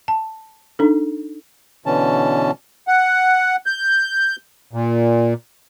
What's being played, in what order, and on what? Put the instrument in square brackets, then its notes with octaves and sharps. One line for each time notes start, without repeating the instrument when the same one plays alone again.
[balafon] A5
D4 D#4 A4
[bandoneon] B2 D3 E3 C#4 A5
[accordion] F#5
G6
A#2